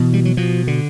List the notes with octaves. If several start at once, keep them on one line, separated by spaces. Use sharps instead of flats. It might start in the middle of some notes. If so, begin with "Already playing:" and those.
Already playing: B2 E3
G3
F#3
B2 F3
D3